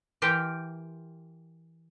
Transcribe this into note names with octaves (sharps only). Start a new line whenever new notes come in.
E3 G4 A#4 C5 F5 G5